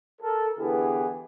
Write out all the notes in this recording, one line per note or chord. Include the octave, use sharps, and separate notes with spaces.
A4 A#4
D3 E3 B3 E4 G4 G#4